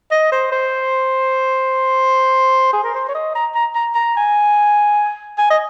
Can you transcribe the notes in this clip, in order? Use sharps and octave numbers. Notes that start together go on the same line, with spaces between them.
D#5
C5
C5
G#4
A#4
C5
C#5
D#5
A#5
A#5
A#5
A#5
G#5
G#5
D#5